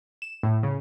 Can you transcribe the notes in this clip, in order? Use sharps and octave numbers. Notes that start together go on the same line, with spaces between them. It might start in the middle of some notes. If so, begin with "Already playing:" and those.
E7
A2
C#3